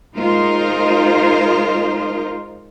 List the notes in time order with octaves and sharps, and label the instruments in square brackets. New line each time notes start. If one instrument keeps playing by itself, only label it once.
[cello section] G#3 D#4 F4 A#4 C5